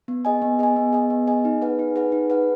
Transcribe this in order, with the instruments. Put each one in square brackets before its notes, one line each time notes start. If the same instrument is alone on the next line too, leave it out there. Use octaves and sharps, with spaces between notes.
[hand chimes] B3
G#4 D#5 G#5
B3
G#4 D#5 G#5
B3
G#4 D#5 G#5
B3
G#4 D#5 G#5
D#4
G#4 B4 F#5
D#4
G#4 B4 F#5
D#4
G#4 B4 F#5